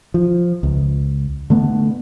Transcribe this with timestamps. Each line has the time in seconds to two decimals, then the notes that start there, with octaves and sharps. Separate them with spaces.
0.14 F3
0.63 C#2
1.50 D3 A3 B3